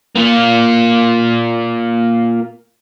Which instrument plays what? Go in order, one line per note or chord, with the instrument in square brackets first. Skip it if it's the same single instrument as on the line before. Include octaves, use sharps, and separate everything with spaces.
[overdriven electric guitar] A#3 F4